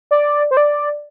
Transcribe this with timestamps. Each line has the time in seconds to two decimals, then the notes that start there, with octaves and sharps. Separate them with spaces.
0.11 D5
0.51 C5
0.57 D5